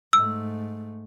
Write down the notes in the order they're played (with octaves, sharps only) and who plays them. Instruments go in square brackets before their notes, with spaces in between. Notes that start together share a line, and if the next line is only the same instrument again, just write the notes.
[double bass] G#2 A3 [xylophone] E6